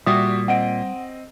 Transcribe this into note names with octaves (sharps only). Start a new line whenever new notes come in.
A#2 G3 F#4 G4 E5 D#6
C4 D#5 F#5 D7